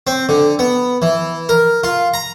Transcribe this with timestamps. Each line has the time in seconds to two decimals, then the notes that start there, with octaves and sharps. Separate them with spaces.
0.07 C4
0.29 D3
0.59 B3
1.02 E3
1.49 A#4
1.84 F4
2.14 A#5